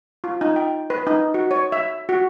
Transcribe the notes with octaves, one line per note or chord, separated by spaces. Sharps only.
F4
D#4
G5
B4
D#4
F#4
C#5
E5
F#4